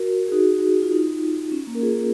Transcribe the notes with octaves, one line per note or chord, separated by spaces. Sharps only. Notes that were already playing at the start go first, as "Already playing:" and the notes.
Already playing: F#4 A#4
G#4
D#4 F#4
F4
D#4
C#4
A#3
A#4
F4 G#4